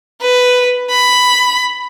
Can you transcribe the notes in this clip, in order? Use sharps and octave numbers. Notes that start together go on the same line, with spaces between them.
B4
B5